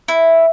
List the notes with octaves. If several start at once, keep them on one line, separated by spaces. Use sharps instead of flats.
E4